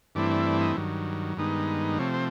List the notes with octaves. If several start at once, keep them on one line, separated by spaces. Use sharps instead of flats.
G2 E3 A3 C4 E4 D5
D5
D5
D#5
G2 D#3 F#3
G2 D#3 G#3 B3 D#4
C3 F3 A3 C4 C#5
C5